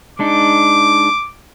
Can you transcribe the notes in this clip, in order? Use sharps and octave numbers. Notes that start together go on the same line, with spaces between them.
G#3 D4 D#4 D6